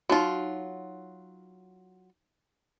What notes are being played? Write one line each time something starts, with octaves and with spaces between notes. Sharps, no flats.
F#3 D#4 F4 F#4